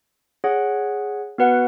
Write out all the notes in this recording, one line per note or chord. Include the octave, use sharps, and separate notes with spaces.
G#4 C#5 F#5
B3 F#4 B4 F#5